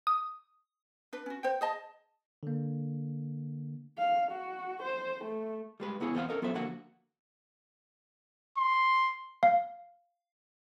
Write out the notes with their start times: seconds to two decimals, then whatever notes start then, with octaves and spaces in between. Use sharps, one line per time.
0.07 D#6
1.13 D4 B4
1.26 C#4 F#4
1.43 C5 G5
1.61 G#4 D#5 A5
2.43 D3 A#3
3.98 F5
4.31 F#4
4.82 C5
5.24 A3
5.80 G3 G#3 B4
6.00 C#2 B3 E4 G#4 C#5
6.14 E2 B3 C4 C5 F5 F#5
6.29 C#4 A4 A#4 D#5
6.42 F#3 B3 F4 A4 C5 E5
6.54 D3 F3 A#3 F#4 F#5
8.58 C6
9.43 F5